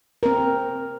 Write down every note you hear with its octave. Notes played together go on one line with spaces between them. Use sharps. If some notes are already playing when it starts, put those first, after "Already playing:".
C4 A#4